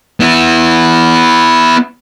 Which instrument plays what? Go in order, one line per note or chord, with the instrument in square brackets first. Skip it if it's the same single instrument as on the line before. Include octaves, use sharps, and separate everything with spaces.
[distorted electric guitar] B3 E4